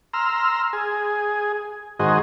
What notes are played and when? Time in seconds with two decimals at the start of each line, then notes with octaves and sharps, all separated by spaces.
0.14 A#5 C6 E6 F6
0.73 G#4
2.00 G#2 D#3 F#4 G#4 C5 D#5